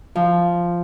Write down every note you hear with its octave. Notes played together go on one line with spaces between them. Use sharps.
F3